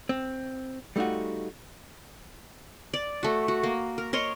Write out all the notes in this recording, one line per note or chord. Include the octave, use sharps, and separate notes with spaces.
C4
G3 A3 D#4 F4 F#4
D5
A3 F#4
F#4
A#3
A#4
A#4 C#5 D#5 C6